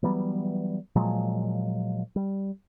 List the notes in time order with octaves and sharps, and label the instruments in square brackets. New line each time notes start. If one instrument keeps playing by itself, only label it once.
[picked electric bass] E3 F#3 G3 B3
A#2 F3 F#3 G#3
G3